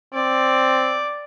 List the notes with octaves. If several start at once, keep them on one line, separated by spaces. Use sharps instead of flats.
C4 D5